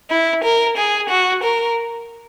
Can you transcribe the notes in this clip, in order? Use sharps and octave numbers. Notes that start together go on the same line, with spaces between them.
E4
A#4
G#4
F#4
A#4